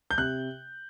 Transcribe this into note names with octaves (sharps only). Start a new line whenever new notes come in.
G6
C3 F#6